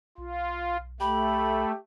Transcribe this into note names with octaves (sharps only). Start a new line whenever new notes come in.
B1 F4
A3 G4 B5